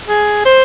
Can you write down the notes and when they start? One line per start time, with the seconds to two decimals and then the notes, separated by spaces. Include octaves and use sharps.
0.08 G#4
0.45 C5